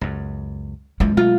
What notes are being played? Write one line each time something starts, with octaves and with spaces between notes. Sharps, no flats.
C#2 F#2
F#2 E3 F3 G#3
B2 F#3 A3 F4